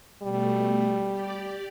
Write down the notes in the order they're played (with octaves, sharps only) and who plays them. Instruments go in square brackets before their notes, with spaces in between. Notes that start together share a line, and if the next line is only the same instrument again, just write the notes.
[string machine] B2 A3 [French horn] G3
[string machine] G4 D5